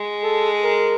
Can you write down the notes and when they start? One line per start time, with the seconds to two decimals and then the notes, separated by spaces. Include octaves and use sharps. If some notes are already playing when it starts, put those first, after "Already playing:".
Already playing: G#3
0.23 A4
0.64 A#4